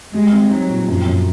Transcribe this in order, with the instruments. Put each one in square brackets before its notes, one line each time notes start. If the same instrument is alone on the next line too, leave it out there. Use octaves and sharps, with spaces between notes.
[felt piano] G3 [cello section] G#3
[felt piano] C4
[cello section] F#3 [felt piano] D#4
[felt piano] A#2
[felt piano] F#2 [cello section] F3
[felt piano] F#2